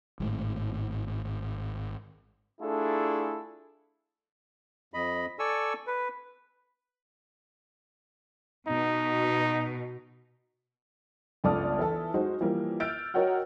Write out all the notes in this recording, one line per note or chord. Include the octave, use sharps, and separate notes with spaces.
G#1 A2 G#3
A3 D4 E4 F4 G#4 A4
F2 D#5 B5
A4 D5 G#5 C#6 E6
B4
B2 D#4
G1 C#2 A4 D5 D#6 F6
E3 E4 A4
G#3 D#4 F#4 C5
E3 F3 G3 A#3
E6 F6 G6 A6 D7
F#4 A#4 C#5 D#5 F#5 G5